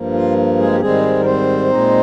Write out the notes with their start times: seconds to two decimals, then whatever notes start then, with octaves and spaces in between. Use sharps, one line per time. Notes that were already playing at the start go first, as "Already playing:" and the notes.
Already playing: G2 F3 A#3
0.14 F4
0.59 G#3 G#4
0.73 G4
0.81 G#2 D#3 G3 G#3 C4 G#4
1.19 A#4
1.25 C4 C5
1.70 A#2 G#3 D#4